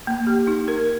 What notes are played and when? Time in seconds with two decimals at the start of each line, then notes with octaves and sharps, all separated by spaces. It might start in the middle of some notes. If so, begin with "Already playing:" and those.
0.07 A#3
0.27 G4
0.47 D#4
0.68 A#4